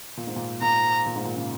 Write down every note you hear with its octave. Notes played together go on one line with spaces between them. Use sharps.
A#2
G#2
A#2
A#2 A#5
A#2
G#2
A#2
C#3